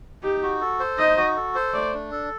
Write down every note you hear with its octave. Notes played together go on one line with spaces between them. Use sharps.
D#4 G4
F#4
A4
C5
D#4 D#5
F#4
A4
C5
A3 D5
D4
A4